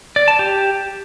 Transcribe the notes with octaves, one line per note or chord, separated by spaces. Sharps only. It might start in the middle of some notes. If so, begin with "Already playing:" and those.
D5
A5
G4